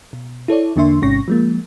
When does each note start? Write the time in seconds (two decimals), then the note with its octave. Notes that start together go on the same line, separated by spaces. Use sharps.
0.13 B2
0.48 E4 A4 C#5 D5
0.76 E2 D3 A#3 D4 E5 C6
1.02 A1 G#2 C3 C#4 C#6 A#6
1.28 F3 G#3 A#3